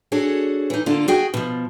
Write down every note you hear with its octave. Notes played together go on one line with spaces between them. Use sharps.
D4 F#4 G#4 A4 C#5
E3 D#4
D3 A#3 F4 A4 D5
F#4 G#4 G5
B2 F3